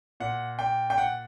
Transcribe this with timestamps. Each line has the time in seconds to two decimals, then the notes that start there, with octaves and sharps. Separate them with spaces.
0.20 A#2 F#5
0.59 G5
0.90 G5
0.98 F#5